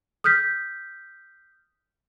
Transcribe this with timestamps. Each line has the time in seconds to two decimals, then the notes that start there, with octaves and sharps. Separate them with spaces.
0.24 D#6 F6 G6 B6